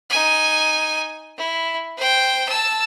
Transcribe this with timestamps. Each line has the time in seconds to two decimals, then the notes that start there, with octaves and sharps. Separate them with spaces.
0.10 D#4 G#5
1.37 E4
1.97 C5 G5
2.49 A5 E6